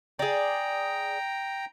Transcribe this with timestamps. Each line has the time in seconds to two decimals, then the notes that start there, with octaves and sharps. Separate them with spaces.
0.19 G#4 D5 G5 A#5